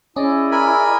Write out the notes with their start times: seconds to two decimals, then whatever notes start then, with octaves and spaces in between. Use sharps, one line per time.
0.16 C#4 E4 G#4 D5 D#5
0.52 A#4 G#5 B5